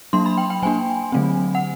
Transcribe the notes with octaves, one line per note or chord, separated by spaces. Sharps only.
F#3 A#3 D4 C6
B5
G5
G5
F#3 A#3 D4 G#5
D3 F#3 A3 C4
F#5